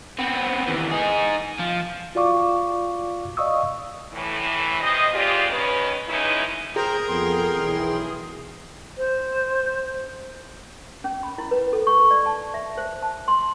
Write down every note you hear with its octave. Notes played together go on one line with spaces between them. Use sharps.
B3 C4
D#2 E3
D#4 G#4
F3
F4 F#4 D5 F5 C#6 D6
D5 D#5 F5 C#6 D#6 E6
A2 E3
G2 C3 C5 D#5
D2 G#3 C4 F4 G4 D5
D#3 C#4 B4
B2 E3 G#3 C#4 D#4 E4
G#4 A#4 C5 G5 A#5
F2 B3 A4 G5 C6
B1 E3
C5
C#4
B5
E4
B4
A4
C#6
D5
A5
E5
C5
A5
C6